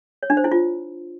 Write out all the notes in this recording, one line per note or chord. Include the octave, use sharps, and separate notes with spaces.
C#5
D4
C5
E4
F4